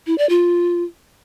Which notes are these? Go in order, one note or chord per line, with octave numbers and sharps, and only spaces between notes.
E4
D5
F4